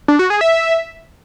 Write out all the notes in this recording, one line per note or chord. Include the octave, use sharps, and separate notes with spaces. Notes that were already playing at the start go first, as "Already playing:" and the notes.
D4
F#4
G#4
E5